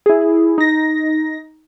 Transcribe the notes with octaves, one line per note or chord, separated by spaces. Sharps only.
E4 G#4
D#4 A#6